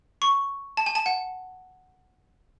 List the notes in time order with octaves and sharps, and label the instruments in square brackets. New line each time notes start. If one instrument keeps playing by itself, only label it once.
[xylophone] C#6
A5
G#5
A5
F#5